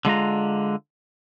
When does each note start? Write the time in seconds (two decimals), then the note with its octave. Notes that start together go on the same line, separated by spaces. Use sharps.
0.05 D3 G#3 F4 A#5